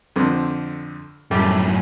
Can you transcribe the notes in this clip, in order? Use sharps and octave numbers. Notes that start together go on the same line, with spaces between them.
F2 D3 C4
F#2 A2 G3 A3 G4